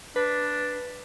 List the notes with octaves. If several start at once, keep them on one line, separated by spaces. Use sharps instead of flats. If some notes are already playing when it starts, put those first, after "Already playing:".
D4 B4